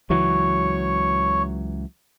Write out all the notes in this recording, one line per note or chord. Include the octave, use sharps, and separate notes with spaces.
C#2 E3 F#3 C#5 C#6